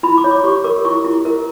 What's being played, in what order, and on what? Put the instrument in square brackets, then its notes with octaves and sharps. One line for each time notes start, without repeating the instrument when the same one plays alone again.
[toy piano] E4 B5
D6
C#5
D6
G4 C#6
A#4 D6
E4 C#6
E4
A#4